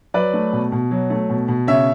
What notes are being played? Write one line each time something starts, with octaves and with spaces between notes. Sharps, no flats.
F#3 B4 D5
A3
B2
B2
F#3
A3
B2
B2
C#3 C#5 E5